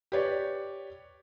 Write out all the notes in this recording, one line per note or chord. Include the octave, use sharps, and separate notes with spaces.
G4 B4 C#5 D5